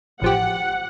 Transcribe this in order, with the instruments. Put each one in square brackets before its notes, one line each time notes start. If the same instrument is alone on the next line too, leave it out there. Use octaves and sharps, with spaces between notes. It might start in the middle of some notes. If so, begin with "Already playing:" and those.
[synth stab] A1 F3 G4 [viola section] F#5